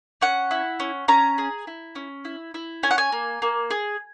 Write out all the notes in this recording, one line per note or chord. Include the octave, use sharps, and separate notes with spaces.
C#4 F#5
E4
C#4
C#4 A#5
G#4
E4
C#4
E4
E4
C#4 G#5
F#5
G#5
A#3
A#3
G#4